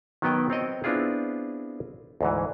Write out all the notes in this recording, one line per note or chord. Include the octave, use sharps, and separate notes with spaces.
D#3 F#3 B3 D#5 G5
C4 C#5 D#5 G5
B3 C4 D4 E4 F4 G#4
D2 G#2 E3